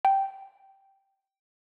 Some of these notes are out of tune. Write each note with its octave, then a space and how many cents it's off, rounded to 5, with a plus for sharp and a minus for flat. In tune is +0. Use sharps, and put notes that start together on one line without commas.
G5 -5